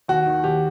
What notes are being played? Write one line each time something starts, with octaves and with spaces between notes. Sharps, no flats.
D#2 F#4
D#3
D#2 G4